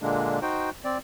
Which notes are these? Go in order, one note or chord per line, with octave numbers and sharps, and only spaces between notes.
A#2 D3 G#3 A#3 D4
D#4 F#4 C5 G5
C4 D5